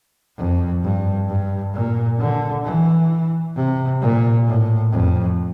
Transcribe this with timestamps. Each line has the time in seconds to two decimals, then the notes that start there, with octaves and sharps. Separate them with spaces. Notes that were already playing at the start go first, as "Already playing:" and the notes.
0.38 F2
0.84 G2
1.29 G2
1.74 A#2
2.20 D3
2.65 E3
3.56 C3
4.02 A#2
4.47 A2
4.92 F2